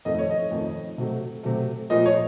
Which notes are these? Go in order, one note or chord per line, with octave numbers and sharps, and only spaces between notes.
F2 D#3 A3 D#5
C#5
D#5
F2 D#3 A3
C3 F#3 A3
C3 F#3 A3
A#2 F3 A3 D#5
C#5